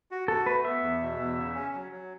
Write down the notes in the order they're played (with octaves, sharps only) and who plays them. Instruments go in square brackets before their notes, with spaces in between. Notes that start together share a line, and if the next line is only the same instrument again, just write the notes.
[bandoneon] F#4
[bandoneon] F#4 [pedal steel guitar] A4
[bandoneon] A3 [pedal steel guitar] B4
[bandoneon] B3 [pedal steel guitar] E5
[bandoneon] E2
B2
E2
C#3
C#4
F#3
F#3